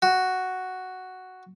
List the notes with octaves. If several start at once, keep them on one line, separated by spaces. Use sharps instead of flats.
F#4